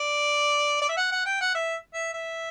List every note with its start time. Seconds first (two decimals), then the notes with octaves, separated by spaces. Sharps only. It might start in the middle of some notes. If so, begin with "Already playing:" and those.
Already playing: D5
0.81 D5
0.89 E5
0.97 F#5
1.12 F#5
1.26 G5
1.41 F#5
1.55 E5
1.94 E5
2.13 E5